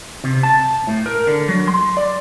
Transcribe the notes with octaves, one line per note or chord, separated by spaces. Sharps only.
C3
A5
A2
A#4
D3
F#3
C6
D5